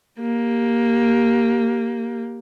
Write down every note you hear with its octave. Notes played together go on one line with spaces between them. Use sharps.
A#3 G4